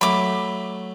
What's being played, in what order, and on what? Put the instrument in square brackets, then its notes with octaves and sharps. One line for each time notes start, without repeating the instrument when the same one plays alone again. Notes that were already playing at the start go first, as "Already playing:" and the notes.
[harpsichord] F#3 A3 [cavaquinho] B5 D6